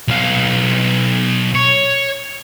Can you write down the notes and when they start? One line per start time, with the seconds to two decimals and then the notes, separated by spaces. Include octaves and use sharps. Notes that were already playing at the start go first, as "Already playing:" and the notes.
0.08 B1 F5
1.55 C#5